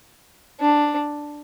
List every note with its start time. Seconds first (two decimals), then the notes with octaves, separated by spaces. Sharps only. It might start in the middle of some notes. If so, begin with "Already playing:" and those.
0.61 D4